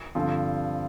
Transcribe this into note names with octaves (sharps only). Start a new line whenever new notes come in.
G2 D3 F3 C4